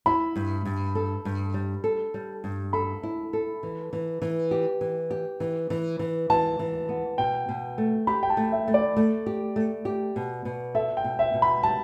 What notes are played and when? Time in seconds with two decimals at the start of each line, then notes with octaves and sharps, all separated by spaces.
0.06 E4 B5
0.36 G2
0.65 G2
0.95 A4
1.25 G2
1.54 G3
1.84 A4
2.14 G3
2.44 G2
2.73 A4 B5
3.03 E4
3.33 A4
3.63 E3
3.93 E3
4.22 E3
4.51 G4
4.81 E3
5.11 G4
5.40 E3
5.70 E3
5.99 E3
6.30 E3 A5
6.59 E3
6.89 B3
7.18 B2 G5
7.49 B2
7.78 A3
8.07 G4 B5
8.23 G5
8.30 A5
8.37 A3
8.52 E5
8.68 A3
8.74 D5
8.97 A3
9.26 G4
9.56 A3
9.85 G4
10.16 B2
10.45 B2
10.75 A4 E5
10.97 G5
11.04 B2
11.19 E5
11.34 B2
11.42 B5
11.63 G3 A5